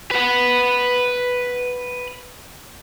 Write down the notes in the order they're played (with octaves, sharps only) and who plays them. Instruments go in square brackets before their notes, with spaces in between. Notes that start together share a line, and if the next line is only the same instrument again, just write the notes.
[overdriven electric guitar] B4 F#5